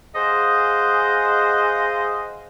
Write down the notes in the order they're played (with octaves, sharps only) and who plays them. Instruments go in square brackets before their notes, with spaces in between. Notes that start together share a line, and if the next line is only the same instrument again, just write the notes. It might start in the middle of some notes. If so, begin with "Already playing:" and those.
[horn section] G#4 C5 D#5 F5 F#5